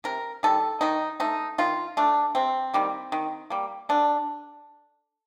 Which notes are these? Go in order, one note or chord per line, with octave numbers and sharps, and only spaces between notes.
C3 A#4
D#3 G3 A4
D#3 D#4
A3 D#4
D#3 F4
A3 D4
C3 C4
D#3 G3 A#3
D#3
G3 A#3
D3 D4